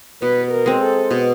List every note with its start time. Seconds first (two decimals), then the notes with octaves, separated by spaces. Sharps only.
0.22 B2 B4
0.51 A#4
0.66 G#3 C4
0.81 A4
1.11 B2